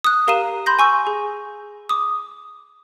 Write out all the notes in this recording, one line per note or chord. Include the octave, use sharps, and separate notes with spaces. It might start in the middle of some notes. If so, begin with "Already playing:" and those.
D#6 F#6
G4 A#4 F5 A#5 D#7 E7
B5 C6 G6 A#6
G#5 C#6 E6 G6
G#4
D6 D#6